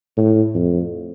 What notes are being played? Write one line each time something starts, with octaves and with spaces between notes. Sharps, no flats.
A2
F2